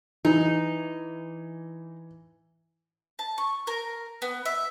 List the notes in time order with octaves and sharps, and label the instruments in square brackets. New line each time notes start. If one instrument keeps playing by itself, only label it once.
[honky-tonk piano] E3 [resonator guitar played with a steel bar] D#4
[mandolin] A5
C#6
A#4
B3
E5